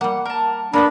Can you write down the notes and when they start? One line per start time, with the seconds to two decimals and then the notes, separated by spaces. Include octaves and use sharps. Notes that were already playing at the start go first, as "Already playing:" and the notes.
0.01 G3 A#3 F#5
0.25 A#4 A5
0.74 A#3 B3 D4 F4 A#4 B5